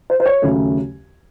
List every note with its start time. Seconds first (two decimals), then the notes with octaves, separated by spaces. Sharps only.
0.10 C5
0.20 C5
0.26 C#5
0.42 D#2 C#3 F#3 A3